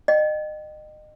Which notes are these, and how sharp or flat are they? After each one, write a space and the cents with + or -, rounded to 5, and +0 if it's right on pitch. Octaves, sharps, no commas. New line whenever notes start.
D#5 -30 G5 -30